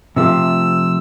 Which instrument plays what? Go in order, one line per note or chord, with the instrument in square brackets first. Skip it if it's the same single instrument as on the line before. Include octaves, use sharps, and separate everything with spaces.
[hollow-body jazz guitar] C3 F3 A3 [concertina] E6